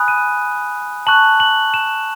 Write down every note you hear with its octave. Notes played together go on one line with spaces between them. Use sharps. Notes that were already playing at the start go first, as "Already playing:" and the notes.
Already playing: G#5 B5 D#6 F#6
D#7
A5 C#6 F#6 F#7
F#7
E7